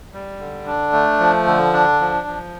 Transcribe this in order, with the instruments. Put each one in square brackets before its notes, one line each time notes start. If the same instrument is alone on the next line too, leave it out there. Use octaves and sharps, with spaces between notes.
[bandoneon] G3
D3
D4
A3
F3
D3
D4
F3
F3